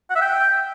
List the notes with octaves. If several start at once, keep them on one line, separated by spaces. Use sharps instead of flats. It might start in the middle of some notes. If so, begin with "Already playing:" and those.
F#5
E5
G5